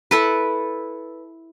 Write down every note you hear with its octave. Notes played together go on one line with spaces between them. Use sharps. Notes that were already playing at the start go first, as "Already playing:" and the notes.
E4 A4 B4